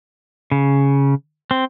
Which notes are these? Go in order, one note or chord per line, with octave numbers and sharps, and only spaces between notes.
C#3
C4